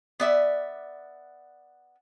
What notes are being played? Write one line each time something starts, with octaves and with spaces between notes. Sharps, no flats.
B3 D5 E5